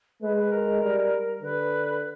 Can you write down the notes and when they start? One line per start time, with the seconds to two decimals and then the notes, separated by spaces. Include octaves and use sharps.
0.22 G#3 B4
0.37 B4
0.52 A#4
0.82 G3
1.42 D3 B4